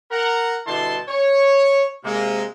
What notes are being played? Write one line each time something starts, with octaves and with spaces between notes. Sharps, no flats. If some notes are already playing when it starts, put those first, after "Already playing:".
A#4 F#5 A#5
B2 D3 G3 E4 A5 C6
C#5
C3 G#3 A#3